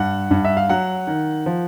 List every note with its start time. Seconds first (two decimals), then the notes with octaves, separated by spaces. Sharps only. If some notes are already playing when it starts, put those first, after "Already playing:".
Already playing: G2 F#5
0.31 G2
0.45 E5
0.57 F5
0.69 F#3 F#5
1.07 D#3
1.46 F3